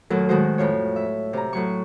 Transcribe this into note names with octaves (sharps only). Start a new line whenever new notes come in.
D#2 A#2 F#3 A3 A4 A#4
A2 D#3 G#3 F#4 A#4 C5
F2 A2 F4 C#5
E5
C3 A#5
A2 F#3 C#6